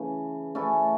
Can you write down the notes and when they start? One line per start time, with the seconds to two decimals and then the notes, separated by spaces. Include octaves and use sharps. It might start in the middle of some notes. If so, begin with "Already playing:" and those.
Already playing: C#3 E3 A3
0.55 A3 C#4 E4 A4